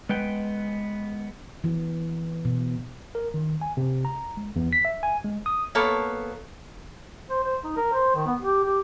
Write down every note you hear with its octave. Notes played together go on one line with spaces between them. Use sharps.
G#3 B3 B4 G5
E3
B2
A#4
D#3
G#5
C3
A#5
G#3
E2
B6
E5
G#5
G#3
D#6
A#3 B3 A4 C#5
C5
C5
D#4
A#4
C5
D#3
B3
G4
G4